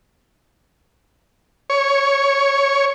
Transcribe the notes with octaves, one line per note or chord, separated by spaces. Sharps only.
C#5